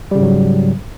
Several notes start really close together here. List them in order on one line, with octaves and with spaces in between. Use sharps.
G3 C#3 G#2 F#3